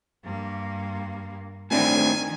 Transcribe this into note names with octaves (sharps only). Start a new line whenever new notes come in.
G2 A#3
A2 D#3 C4 D4 G#5